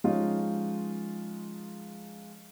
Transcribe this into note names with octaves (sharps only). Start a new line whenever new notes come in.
F3 G#3 C#4 D#4 F4